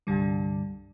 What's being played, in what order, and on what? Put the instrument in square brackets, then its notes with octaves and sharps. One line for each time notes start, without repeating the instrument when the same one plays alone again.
[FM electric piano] C2 G2 D3 G3